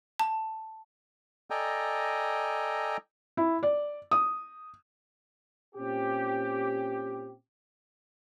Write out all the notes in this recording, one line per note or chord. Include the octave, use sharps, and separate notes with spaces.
A5
A4 D5 D#5 G5 G#5 A#5
E4
D5
D#6
A#2 C4 C#4 G4